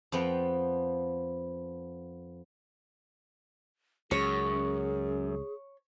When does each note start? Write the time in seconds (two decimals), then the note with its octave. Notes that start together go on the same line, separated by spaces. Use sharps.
0.12 F2 F3 B3 G5
4.11 C#2 F#2 G#4 C#5